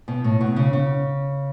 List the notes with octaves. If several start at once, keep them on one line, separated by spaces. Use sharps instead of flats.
B2
A2
B2
C#3
C#3